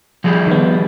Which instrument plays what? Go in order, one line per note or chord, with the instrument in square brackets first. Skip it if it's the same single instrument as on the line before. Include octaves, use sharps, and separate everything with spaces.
[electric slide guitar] F3 G3 G#4
[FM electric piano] D#3 B3